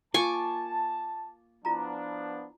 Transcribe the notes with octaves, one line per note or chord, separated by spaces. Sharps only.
A#3 F4 G#5 A5 C#6 D6
F3 B3 D4 E4 F4 A#5